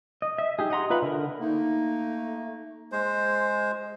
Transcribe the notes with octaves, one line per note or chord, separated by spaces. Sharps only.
D#5
E5
D#4 G4 G#4
D#5 F#5 A#5 C6
F4 B4 E5 F#5 B5
D3 A#4
A3 A#3 D#4
G#3 C5